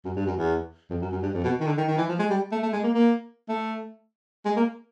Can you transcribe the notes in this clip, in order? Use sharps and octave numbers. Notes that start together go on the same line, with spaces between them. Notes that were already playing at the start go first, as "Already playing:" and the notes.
F#2
G2
F#2
E2
F2
F#2
F#2
G2
F2
B2
D#3
D3
D#3
D#3
E3
F3
G#3
G3
A3
A3
G#3
A#3
A#3
A3
G#3
A#3